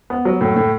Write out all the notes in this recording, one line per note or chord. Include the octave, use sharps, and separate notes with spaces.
B3
F#3
A2
A2